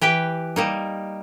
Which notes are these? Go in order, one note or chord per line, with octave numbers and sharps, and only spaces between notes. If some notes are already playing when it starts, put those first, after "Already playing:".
E3 G4 B4 G5
G3 A#3 D#4